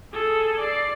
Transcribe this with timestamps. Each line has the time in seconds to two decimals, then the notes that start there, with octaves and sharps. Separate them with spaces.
0.13 G#4 A4
0.60 D5 C7